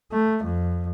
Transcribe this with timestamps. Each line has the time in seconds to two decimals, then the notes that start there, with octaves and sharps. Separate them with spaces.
0.12 A3
0.44 F2